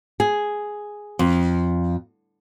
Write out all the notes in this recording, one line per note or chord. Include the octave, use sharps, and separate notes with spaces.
G#4
F2